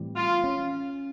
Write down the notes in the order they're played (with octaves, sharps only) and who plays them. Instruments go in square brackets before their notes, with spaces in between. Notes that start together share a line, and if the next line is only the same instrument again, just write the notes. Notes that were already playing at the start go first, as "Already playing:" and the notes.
Already playing: [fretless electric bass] A2 E3 G3 C4
[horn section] F4
[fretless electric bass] C#4